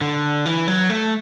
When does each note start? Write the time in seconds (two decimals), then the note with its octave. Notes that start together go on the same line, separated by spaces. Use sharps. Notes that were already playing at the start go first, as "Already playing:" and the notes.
0.01 D3
0.46 E3
0.68 F#3
0.90 A3